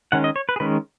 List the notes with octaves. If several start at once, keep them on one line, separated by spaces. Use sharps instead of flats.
D#3 G#3 C#4 F#5
D#5
C#5
B4
G#4
D#3 G#3 C#4 B4